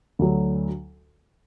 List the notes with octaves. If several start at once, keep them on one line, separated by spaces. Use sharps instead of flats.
D2 D3 F#3